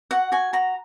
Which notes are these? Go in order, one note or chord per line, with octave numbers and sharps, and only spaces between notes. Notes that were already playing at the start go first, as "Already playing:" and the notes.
F#4 F#5
F#4 G#5
F#4 A#5